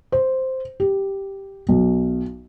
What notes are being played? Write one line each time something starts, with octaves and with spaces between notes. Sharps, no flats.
C5
G4
B1